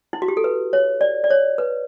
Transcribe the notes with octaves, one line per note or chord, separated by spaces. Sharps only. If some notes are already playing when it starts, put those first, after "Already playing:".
E4
F#4
G4
A4
B4
C#5
D5
D5
C#5
B4